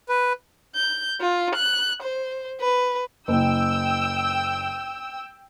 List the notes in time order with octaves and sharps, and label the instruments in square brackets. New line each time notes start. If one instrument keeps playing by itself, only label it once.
[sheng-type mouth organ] B4
[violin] G6
F4
F#6
C5
B4
[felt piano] F#1 [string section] G5 E6